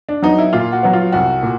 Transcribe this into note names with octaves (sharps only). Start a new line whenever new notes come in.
D4
F#3 B3 D#4
E4
A#2 F4
F#4
F#3 B3
F4
C2 F#4
A#2